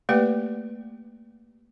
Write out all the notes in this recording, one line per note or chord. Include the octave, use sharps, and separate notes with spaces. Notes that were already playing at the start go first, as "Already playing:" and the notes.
A3 A#3 G4 B4 D5 G5